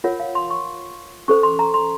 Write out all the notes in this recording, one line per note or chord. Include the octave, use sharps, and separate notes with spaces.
F4 A#4 C#5 F#5
F5
C6
C#6
C#4 A4 C5 C#6
C6
A#5
C6